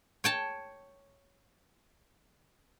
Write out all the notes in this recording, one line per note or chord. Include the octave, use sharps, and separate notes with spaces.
C#5 G5 A5